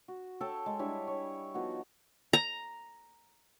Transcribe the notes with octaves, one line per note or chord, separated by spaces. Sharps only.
F#4
A4 C#5 G5 A5
G#3
G3 D4 E4 C#5
C#5
F3 B3 D#4 F#4
A#5